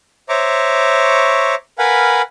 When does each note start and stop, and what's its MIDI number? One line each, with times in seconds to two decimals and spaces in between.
0.29 1.55 72
0.29 1.55 73
0.29 1.55 76
0.29 1.55 82
0.29 1.55 85
0.29 1.55 86
1.79 2.22 70
1.79 2.22 71
1.79 2.22 77
1.79 2.22 78
1.79 2.22 80
1.79 2.22 83